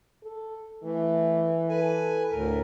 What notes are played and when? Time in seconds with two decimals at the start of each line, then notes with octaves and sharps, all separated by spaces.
0.24 A4
0.84 E3 A3
1.69 A4 B4 G#5
2.31 D2 A2 A#4